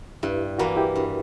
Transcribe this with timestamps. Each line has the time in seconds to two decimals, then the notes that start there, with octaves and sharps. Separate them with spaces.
0.23 G2 E4 G4
0.59 E3 A#3 F#4 A#4
0.77 E4 G4
0.96 G2